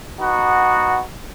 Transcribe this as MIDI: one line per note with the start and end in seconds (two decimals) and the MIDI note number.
0.21 1.03 59
0.21 1.03 63
0.21 1.03 66